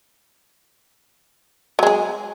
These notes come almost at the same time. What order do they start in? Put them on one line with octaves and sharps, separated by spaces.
F#3 G#3 G#4